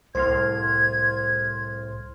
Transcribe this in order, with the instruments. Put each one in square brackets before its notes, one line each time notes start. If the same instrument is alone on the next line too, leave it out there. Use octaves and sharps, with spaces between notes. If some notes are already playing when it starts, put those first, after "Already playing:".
[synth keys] C2 A2 [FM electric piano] C5 C6 F6 [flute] G#6